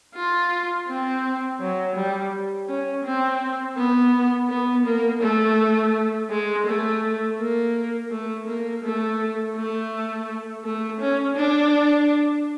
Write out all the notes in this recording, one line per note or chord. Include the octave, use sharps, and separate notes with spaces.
F4
C4
F#3
G3
C#4
C4
B3
B3
A#3
A3
G#3
A3
A#3
A3
A#3
A3
A3
A3
C#4
D4